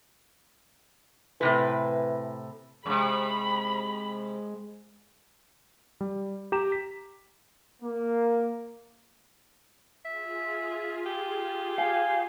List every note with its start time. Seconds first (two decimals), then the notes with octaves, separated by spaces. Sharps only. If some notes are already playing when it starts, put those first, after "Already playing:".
1.41 A2 C3 E3 B4
2.86 F#2 C3 G#3 B5
6.01 G3
6.52 G4 A#5 E7
6.72 B6
7.82 A#3
10.05 F4 G#4 E5
11.06 G4
11.78 F5 G#5